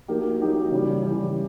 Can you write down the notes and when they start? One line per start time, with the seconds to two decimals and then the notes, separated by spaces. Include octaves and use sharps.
0.08 F#3 A#3 D#4 G4 A#4
0.40 F#3 A#3 D#4 G4 A#4
0.71 C#3 E3 G3
1.03 C#3 E3 G3